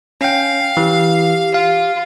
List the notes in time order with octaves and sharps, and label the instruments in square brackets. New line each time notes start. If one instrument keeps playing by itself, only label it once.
[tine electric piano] C#4 G5 [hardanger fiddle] F5
[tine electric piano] E3 [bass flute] G4
[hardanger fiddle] F4 [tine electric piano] F5